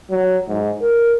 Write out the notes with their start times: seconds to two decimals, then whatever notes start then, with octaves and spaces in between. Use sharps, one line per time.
0.10 F#3
0.48 G#2
0.81 A#4